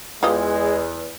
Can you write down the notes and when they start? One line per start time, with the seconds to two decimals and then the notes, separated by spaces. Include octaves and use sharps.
0.23 E2 G#3 F4 G4 D#5